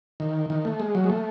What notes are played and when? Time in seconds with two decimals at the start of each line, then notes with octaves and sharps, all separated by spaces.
0.20 D#3
0.50 D#3
0.65 A3
0.80 G#3
0.95 F#3
1.04 G#3
1.10 A3